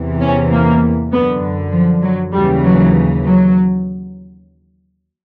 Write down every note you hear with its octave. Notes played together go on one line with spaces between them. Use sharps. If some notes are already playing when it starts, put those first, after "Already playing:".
Already playing: E2 C3 E3
C#4
A#3
F#2 D3 B3
F3
F#3
D#2 C#3 E3 G3
F#3
F#3